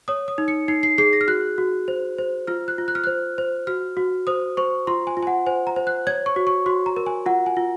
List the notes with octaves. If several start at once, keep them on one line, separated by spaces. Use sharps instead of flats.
C#5 D#6
D#6
D#4
C#7
D#4 C7
C7
G#4 C7
A#6
F6
F#4 F#6
F#4
C5
C5
F4 F6
F#6
F4
F#6
F6
C5 F#6
C5
F#4 F6
F#4
C5 D#6
C5 C#6
F4 C6
G#5
F4
G#5
F#5
C5 G#5
A#5
C5
F#6
C#5 G#6
C#6
F#4
C#6
F#4 C6
A#5
A#4
G#5
F4 F#5
G#5
F4